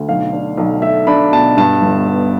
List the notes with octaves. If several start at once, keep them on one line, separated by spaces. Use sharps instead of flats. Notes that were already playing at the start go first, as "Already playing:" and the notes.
Already playing: D2
B1 F5
D4
B1
A3 E5
D4 B5
B2 A5
G2 A5
G1
B3